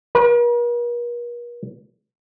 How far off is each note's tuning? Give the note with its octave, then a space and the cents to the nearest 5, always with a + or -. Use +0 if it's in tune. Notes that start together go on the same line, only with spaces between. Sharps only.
A#4 +45